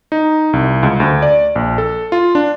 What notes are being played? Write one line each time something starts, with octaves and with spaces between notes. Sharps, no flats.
D#4
C2
C#2
D2
D5
A#1
A4
F4
D4